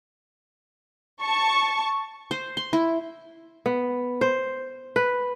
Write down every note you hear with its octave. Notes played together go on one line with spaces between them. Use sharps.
A5 C#6
C5
C6
E4
B3
C5
B4